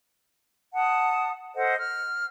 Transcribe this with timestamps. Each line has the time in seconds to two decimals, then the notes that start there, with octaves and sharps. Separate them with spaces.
0.74 F#5 A5 D#6
1.54 A4 C5 D#5 F#5
1.79 F6